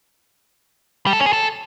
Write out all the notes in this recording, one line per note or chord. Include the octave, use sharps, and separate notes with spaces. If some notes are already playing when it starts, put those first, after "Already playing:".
G3
A4
C#4
G#4
A4